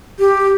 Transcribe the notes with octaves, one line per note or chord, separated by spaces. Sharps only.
G4